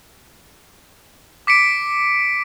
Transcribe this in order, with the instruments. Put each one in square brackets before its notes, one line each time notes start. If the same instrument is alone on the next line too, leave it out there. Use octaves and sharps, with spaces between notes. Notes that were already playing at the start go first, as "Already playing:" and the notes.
[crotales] D6 B6 C#7 D7